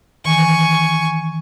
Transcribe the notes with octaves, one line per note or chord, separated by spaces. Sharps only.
D#3 E3 G#5 C#6